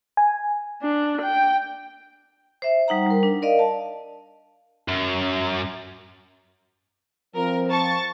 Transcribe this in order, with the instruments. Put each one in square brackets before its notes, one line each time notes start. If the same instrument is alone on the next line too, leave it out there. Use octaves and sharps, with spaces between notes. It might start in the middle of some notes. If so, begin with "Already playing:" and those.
[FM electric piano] G#5
[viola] D4
G5
[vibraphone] C5 E5
G3 D#4 F#5 A#5
G3 A#4
D4
A#4 D5 D#5 F5
A5
[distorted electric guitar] F#2
[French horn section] F3 C4 [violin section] A#4
[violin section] A5 C#6 A6